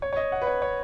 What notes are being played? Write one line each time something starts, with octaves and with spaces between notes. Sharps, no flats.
C#5
C#5
D#5
F#5
B4
C#5
C#5